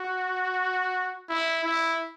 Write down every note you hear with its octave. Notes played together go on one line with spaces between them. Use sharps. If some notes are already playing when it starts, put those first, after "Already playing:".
Already playing: F#4
E4
E4